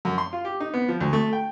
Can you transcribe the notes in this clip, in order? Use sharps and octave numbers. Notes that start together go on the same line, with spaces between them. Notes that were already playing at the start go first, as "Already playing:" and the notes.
F#2
C6
F4
G4
D#4
B3
F3
D2
A3
G5